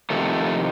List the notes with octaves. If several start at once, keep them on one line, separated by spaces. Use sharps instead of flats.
F2 C3 D#3 A3